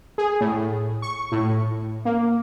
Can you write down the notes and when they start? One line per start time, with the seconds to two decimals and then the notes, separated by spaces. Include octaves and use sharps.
0.18 G#4
0.41 A2
1.02 C#6
1.32 A2
2.05 A#3